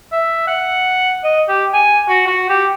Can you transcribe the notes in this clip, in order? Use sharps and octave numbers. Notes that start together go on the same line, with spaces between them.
E5
F#5
D#5
G4
G#5
F#4
F#4
G4